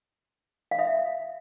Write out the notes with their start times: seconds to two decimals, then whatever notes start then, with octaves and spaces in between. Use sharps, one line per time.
0.71 F5
0.79 E5